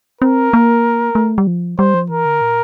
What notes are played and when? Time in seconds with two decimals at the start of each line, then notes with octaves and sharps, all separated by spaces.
0.21 C4 A#4
0.53 A#3
1.15 A3
1.38 G3
1.47 F3
1.78 G3 C5
1.94 F3
2.10 E3 A#4
2.25 D3
2.41 A#2